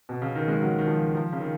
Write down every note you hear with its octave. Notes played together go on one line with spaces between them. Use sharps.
B2
C#3
D#3
G#3
F#3
D#3
F3
F3
C#3
D#3